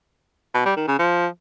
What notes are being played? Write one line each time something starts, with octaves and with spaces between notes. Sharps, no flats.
B2
G3
D#3
C#3
F3